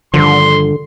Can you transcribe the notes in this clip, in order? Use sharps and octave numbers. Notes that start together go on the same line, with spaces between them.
G2 D3 D#3 F3 C6